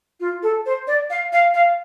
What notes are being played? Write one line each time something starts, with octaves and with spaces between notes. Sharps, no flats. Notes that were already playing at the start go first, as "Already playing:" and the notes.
F4
A4
C5
D5
F5
F5
F5